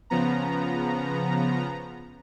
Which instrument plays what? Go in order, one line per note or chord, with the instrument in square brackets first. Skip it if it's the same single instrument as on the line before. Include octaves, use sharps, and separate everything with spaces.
[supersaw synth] C#3 F3 B3 A#5